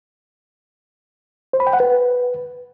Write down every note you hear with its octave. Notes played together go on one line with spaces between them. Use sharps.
C5
B5
G5
F#5
B4